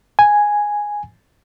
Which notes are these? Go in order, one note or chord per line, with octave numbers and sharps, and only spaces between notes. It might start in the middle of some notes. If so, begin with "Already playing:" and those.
G#5